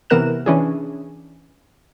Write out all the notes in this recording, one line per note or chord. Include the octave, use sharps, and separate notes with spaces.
C3 E3 B3 A#4 F#6 E7
E3 C#4 D4 G#4